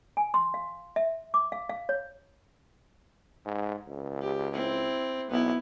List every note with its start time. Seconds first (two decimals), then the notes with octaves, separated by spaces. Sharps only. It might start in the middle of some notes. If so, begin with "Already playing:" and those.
0.17 G#5
0.34 C6
0.54 F5
0.96 E5
1.34 D6
1.52 F5
1.69 F5
1.89 C#5
3.45 G#2
3.87 C#2
4.22 G4
4.53 C4 E4
5.30 B1 B3 E4